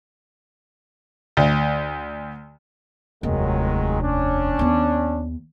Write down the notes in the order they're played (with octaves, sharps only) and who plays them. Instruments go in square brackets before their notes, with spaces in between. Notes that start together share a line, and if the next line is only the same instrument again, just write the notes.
[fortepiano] D2
[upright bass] F1 D#2 [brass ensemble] D#3 F#3 G#3
[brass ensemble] C#4 D4
[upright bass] D#2 B3